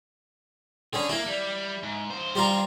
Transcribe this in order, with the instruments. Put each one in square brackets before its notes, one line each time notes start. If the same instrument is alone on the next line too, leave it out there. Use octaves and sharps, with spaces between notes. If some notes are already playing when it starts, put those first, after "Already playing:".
[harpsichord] D3 C#4 [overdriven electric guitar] G#4
[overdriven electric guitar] A#3 [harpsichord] E4
[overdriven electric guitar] G3
G#2
G2 C5
[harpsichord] G3 F4 A#5